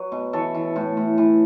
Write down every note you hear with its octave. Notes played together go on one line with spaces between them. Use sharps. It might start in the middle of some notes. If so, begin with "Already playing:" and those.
Already playing: F#3 B4
B2
E3 A4 C#5
E3
A2
A2
E3